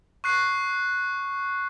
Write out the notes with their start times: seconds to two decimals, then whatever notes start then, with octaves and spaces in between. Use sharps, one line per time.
0.24 C#6 F#6 C7